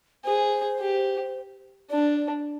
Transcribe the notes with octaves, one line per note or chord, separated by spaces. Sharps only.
G#4 C5
G4
D4 D5